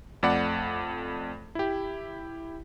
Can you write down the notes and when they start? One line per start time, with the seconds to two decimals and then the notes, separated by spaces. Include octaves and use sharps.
0.23 F2 A3 D5 F#5 B5
1.55 E4 G4